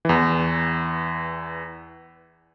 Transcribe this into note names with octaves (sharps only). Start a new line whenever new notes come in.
E2 E3